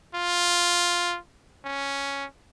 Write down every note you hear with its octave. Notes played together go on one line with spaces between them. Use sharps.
F4
C#4